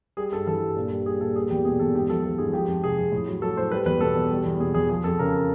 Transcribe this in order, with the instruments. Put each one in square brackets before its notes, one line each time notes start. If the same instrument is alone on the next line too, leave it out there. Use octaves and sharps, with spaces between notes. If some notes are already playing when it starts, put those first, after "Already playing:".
[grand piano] G3 G#4
G2 A4
E3 A4
G2
A#2
G3
G3 G#4
A#2 A4
G3 G#4
E2 G4
B2 G#4
E2 A4
G#2 G4
F3 A4
F3 A4
G#2 G#4
F3 G4
F2
C3 G#4
F2
A2
F#3
F#3 A4
A2 C5
G3 B4
E2 B4
B2 A4
E2
G3
E2
B2 G#4
E2 G#4
F3 G#4
F2 A4
C#3 A#4